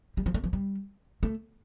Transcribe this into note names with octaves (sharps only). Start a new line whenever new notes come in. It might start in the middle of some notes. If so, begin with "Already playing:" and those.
G3
F3
A3
F3
G3
A3